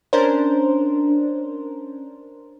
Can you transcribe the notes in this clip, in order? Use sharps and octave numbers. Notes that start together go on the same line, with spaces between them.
C#4 D4 A#4 C5